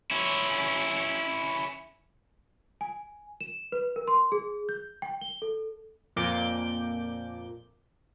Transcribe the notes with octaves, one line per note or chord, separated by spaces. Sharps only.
C#4 E4
G#5
E7
B4
A#4
C6
G#4
G6
G5
G7
A4
F2 A#2 D6 G6